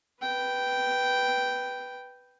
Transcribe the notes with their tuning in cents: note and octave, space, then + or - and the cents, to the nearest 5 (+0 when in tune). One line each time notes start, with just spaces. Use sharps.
B4 +0 G5 -5